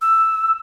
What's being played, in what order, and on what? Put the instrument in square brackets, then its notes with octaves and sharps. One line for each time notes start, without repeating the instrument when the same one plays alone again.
[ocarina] E6